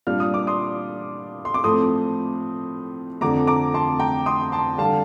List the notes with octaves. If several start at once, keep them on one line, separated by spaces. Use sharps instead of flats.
A#2 G3 D4 F4 F6
D#6
D6
C6 D#6
C6
D6
A2 F3 A3 C4 C6 D#6
F2 D3 A3 C4 A#5 D6
A#5 D6
A5 C6
G5 A#5
C6 D#6
A5 C6
D3 G3 F5 A5